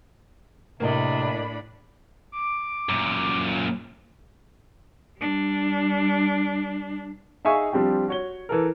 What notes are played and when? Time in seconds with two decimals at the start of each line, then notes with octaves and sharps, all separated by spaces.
0.80 A2 C3 A#3 D4 E4 D#5 B5
2.32 D6
2.89 F#2 A#2
5.19 G3 D4
7.45 D#4 G#4 E5 F5 G#5 C#6
7.72 F3 G3 C4 D4 G4
8.08 F#4 C#5 G7
8.49 E3 A4 A#4